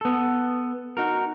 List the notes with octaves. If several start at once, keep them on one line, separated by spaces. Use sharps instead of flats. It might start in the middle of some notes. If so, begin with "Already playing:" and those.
B3 A4
D#4 F#4 A#4